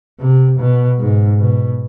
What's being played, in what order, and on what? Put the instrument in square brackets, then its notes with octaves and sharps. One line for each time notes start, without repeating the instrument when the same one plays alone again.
[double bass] C3
B2
G#2
B2